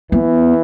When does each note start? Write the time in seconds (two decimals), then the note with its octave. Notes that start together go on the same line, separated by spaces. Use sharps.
0.12 E3 B3